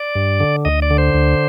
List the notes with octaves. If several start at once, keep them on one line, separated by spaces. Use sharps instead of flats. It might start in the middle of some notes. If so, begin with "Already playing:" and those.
Already playing: D5
G2
D3
D2 D#5
D5
D3
C5
D2